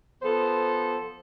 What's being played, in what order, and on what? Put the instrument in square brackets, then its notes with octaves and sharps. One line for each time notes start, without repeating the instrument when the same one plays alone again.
[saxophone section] F3 B3 A4 C5